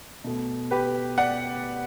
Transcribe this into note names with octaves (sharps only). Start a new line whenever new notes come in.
B2 A3
G4 B4
D5 F#5